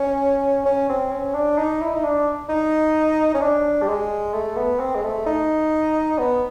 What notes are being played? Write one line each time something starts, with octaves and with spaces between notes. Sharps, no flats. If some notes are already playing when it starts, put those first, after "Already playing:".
Already playing: C#4
C#4
C4
C#4
D4
D#4
E4
D#4
D4
D#4
C#4
D4
G3
G#3
A3
B3
C4
G#3
A3
D#4
B3